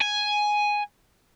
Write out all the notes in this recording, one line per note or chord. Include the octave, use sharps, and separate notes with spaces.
G#5